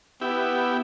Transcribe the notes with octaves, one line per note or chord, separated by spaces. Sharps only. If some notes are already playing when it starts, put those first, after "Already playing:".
B3 E4 G4